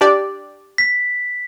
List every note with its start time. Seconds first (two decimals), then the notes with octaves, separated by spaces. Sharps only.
0.01 D4 G4 D5
0.78 B6